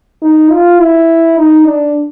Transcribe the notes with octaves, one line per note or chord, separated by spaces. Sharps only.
D#4
F4
E4
D#4
D4